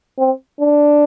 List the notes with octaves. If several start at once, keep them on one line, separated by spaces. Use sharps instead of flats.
C4
D4